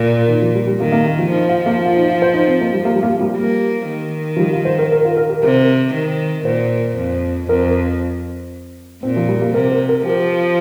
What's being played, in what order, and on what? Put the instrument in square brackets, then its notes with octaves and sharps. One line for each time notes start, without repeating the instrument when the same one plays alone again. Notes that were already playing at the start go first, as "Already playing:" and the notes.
Already playing: [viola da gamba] A#2
[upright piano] D#3
F3
G3
G3
[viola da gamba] D#3 [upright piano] A#3
[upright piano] A#3
F3
[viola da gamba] F3 [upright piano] D#4
[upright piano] F4
A#3
F4
D#4
F4
C5
D#4
C4
A#3
G3
A#3
G3
A#3
G3
[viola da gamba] A#3
D#3
[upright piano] F3
G3
F4
C5
A#4
A#4
F4
A#4
G4
[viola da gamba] C3 [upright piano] A#4
[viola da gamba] D#3
[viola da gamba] A#2 [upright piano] C5
[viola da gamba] F2
[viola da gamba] F2 [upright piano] A#4
[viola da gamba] A#2 [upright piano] C4
[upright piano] F3
G3
A#3
[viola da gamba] C3 [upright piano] A#4
[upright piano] C5
A#4
[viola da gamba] F3 [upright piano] G4